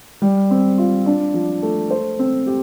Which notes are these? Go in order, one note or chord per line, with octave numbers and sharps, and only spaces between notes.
G3
C4
F4
D4
F3
A3
C5
C4
G4